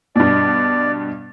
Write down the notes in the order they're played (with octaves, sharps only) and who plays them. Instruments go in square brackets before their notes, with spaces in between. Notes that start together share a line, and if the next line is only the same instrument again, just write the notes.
[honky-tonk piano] G2 B2 [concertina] D5